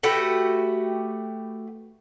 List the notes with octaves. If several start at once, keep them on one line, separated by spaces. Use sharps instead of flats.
A3 F#4 G4 B4